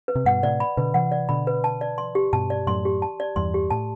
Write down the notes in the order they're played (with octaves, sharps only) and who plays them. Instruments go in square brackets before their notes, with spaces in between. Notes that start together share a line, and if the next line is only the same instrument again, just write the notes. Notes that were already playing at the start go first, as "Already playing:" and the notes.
[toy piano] B4
[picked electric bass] C3
[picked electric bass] G2 B2 [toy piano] F#5
[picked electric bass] A2 C3 [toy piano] D5
[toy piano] B5
[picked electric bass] B2 D3 [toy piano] B4
[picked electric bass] C3 E3 [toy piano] F#5
[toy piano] D5
[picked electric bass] B2 D3 [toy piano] B5
[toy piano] B4
A5
D5
C6
G4
[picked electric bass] G2 B2 [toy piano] A5
[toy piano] D5
[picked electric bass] F#2 A2 [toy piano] C6
[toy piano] G4
A5
D5
[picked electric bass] E2 G2 [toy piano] C6
[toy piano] G4
[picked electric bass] A2 [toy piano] A5